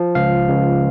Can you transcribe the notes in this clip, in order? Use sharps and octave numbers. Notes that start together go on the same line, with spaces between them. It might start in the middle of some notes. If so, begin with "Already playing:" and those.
Already playing: F3
C#2 F5
C#2